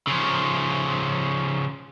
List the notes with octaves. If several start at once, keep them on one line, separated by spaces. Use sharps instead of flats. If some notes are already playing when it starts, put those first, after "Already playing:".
C#3 F3